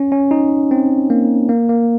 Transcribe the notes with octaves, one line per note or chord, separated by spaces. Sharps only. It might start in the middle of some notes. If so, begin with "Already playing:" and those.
Already playing: C#4
C#4
D#4
C4
A#3
A#3
A#3